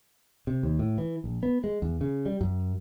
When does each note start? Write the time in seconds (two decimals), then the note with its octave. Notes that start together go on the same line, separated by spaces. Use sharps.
0.47 C3
0.63 D#2
0.79 A2
0.98 E3
1.24 A#1
1.43 B3
1.64 G#3
1.82 E2
2.01 C#3
2.26 G3
2.41 F#2